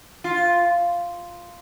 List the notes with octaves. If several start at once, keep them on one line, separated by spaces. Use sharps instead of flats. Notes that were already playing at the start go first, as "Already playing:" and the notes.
F4